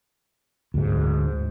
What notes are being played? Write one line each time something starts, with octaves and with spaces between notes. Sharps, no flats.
D2 G#2